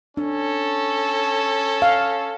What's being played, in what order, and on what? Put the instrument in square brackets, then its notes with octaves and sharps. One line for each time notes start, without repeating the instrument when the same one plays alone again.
[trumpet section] C#4 A4 [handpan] D4
[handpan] F5